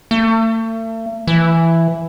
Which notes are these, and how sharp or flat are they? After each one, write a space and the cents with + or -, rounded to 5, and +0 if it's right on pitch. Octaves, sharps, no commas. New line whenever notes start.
A3 +40
E3 +10